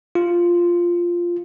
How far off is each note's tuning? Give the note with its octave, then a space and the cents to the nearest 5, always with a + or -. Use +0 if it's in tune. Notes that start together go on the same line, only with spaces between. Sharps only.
F4 -5